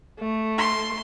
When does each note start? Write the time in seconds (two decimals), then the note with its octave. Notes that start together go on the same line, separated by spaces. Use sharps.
0.20 A3
0.58 C6